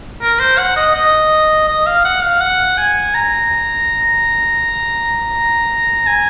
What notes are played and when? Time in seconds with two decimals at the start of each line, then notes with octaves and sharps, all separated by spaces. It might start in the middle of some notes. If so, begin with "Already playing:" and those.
0.22 A#4
0.40 C5
0.58 F#5
0.76 D#5
0.95 D#5
1.68 D#5
1.86 F5
2.05 F#5
2.23 F5
2.41 F#5
2.77 G#5
3.15 A#5
6.07 G#5